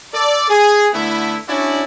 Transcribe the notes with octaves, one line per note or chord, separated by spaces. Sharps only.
A4 D5
G#4
D3 A3 B3 E4
C#4 D4 E4 F#4 D5